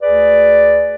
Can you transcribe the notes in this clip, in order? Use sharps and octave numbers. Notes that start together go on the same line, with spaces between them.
D2 G#4 B4 D5